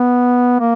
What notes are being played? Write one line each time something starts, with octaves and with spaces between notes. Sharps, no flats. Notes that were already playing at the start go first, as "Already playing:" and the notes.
Already playing: B3
A#3